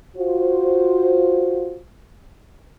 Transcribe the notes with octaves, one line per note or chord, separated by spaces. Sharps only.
F4 F#4 C5